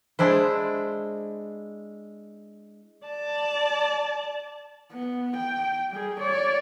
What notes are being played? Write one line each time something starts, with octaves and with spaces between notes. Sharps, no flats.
G#3 D4 E4 C5
D5 A5
B3
G5
G3 G#4
C#5 D5